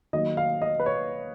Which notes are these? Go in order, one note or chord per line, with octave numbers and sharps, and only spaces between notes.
D#3 F#3 A#3 D#5
F5
D#5
B4
C#5